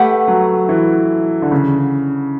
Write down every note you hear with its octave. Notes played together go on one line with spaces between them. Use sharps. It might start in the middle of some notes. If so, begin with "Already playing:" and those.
Already playing: A3 G4 B4 F#5
F#3
E3
D3
C#3